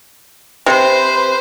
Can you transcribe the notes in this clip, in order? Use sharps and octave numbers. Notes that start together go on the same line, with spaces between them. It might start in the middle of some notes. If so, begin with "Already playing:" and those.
C3 B4 C5